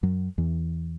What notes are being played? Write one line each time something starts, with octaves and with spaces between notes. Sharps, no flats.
F#2 F#3
E2 E3